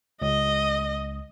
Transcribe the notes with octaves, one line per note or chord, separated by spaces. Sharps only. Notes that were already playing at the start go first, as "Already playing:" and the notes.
C#2 D#5